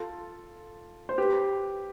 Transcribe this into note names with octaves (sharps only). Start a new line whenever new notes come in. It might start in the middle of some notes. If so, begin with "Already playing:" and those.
Already playing: F4 A4
C5
G4 B4